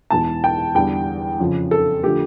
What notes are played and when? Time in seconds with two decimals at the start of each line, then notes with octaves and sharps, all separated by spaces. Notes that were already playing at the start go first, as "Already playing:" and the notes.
0.10 E1 E2 E3 A5
0.44 G5
0.75 E2 D3 G3 G5
1.39 F2 C#3 F3
1.71 A4
2.03 D3 F3 A3 G4